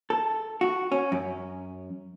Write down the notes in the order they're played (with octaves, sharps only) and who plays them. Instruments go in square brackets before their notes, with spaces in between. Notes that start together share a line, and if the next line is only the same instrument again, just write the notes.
[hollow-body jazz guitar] A4
F#4
C#4
F#2